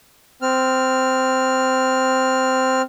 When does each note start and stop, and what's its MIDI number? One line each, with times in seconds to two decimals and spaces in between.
0.42 2.82 60
0.42 2.82 89